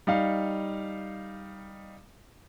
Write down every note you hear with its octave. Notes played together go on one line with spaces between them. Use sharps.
G3 D#4 F5